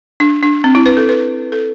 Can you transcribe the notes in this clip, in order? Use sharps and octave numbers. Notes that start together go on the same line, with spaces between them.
D4
D4
C4
E4
B4
A4
B4
A4